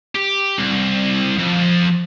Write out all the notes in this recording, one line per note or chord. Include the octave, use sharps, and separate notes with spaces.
G4
C2
F2